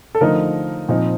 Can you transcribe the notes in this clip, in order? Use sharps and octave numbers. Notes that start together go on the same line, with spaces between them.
A4
D3 F3 A3 D#4 A#4
A#2 F3 C4 D#4